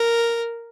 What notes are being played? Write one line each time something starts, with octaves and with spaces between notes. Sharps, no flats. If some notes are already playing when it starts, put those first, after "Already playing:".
Already playing: A#4